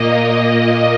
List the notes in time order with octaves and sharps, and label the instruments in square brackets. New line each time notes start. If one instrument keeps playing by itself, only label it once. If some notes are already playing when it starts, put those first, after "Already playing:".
Already playing: [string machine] A#2 A#3 D#5